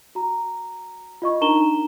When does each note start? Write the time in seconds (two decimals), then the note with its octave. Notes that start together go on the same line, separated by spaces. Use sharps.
0.15 F#4 A#5
1.22 F4 D#5 C#6
1.41 D4 D#4 A#4 A#5 E7 G7